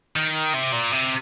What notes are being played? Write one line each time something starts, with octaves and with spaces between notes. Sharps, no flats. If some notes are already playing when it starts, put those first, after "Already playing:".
D#3
C3
A#2
C3